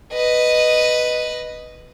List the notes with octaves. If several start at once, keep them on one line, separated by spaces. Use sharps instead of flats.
B4 D#5